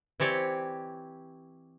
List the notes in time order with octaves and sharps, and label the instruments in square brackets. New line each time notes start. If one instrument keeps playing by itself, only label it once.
[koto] E3 C4 G4 C#5 D5